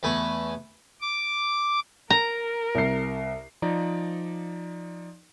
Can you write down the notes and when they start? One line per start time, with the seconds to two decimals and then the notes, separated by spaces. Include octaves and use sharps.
0.03 E2 A3 G#5 B5 C#6
1.01 D6
2.10 A#4 A#5
2.75 C2 C7
3.62 F3 D#4 D5 A#5